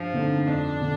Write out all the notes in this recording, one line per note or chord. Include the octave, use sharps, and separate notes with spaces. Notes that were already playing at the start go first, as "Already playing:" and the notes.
Already playing: G2 F3
D3 A3 C4 D#4
F2 D4
D3